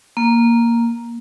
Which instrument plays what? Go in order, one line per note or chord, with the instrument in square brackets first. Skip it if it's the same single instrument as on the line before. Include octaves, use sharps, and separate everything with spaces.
[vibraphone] A#3